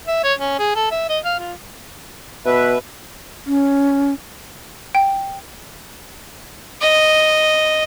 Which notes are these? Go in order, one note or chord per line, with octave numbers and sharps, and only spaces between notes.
E5
C#5
C#4
G#4
A4
E5
D#5
F5
F4
B2 B4 E5
C#4
G5
D#5